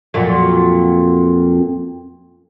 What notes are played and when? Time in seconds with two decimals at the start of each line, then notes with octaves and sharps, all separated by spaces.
0.14 F2 A#2 F#3